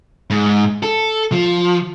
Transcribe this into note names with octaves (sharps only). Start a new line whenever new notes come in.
G#2
A4
F3